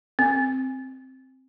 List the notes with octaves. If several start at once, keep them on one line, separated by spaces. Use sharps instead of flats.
C4